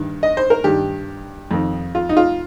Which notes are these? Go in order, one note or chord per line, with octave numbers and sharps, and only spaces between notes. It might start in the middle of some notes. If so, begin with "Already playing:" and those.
Already playing: G2 D#3
D#5
C5
A#4
G2 D#3 G4
F2 D#3
F4
D#4
F4